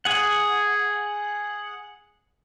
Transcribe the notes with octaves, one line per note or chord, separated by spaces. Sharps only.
G#4 F#5